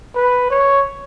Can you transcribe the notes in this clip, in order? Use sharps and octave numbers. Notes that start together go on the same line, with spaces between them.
B4
C#5